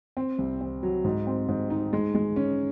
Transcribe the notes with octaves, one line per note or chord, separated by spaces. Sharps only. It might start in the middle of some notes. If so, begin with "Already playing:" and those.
C4
C2
C4
F#3
G#2
C4
G#2
D#4
G#3
G#3
C#4